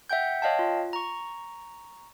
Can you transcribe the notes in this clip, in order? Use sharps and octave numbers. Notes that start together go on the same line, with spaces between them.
E5 F#5 G5 G6
C#5 D#5 F5 G5 A5
F4
A#5 C#6